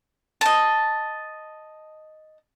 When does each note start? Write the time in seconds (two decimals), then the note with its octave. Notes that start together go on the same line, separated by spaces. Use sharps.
0.41 D#5 A5